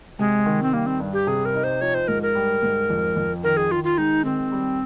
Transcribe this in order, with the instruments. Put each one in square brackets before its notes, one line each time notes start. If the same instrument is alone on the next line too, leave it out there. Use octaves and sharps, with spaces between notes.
[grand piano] C3 [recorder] G#3
[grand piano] D#3
[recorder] C4
[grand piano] G3 [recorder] A#3
[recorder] C4
[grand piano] G2
[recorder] G4
[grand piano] C3 [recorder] G#4
[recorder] A#4
[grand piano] D#4
[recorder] C5
[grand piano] F3 [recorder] C#5
[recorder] C5
[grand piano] G#2 [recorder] A#4
[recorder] A#4
[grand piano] G3
G#2
F2
F2
[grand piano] D#3 [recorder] A#4
[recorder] G#4
[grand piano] D#3 [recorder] F4
[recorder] F4
[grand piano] G#3 [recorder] D#4
[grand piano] D#3 [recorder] C4
[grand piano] G3